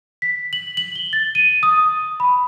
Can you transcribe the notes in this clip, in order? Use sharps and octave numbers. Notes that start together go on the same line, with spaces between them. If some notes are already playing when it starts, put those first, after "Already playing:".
B6
F#7
F#7
G7
A6
D#7
D#6
B5